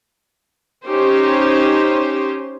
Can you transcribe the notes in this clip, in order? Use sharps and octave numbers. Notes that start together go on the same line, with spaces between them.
C#4 D#4 G4 C5